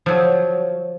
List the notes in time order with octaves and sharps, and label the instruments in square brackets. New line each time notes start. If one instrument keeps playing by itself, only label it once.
[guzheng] F3 F#3